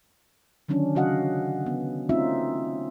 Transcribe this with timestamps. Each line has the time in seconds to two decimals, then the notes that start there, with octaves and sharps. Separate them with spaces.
0.68 D3 D#3 F#3 C#4 D4
0.95 C#3 F#3 F#4 D#5 F5 F#5
1.66 B3
2.09 A3 C4 C#4 D#4 F4 E5